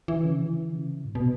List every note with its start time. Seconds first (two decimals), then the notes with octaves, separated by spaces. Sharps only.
0.08 E3
0.24 C#3
0.41 E3
0.73 C#3
1.05 G#2
1.15 B2